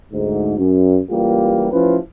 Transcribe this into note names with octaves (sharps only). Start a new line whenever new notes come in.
D2 G#2
F#2
C#2 E3 G3 A#3 F4 G4
A1 F3 C#4 E4 B4